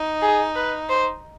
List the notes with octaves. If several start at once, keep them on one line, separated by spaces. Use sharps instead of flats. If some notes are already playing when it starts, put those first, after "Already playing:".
Already playing: D#4
G#4
B4
C5